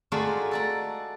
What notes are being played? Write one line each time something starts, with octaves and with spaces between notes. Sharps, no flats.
G#3 A3 D4 D#4 F4 F#4
A4 D5 A#5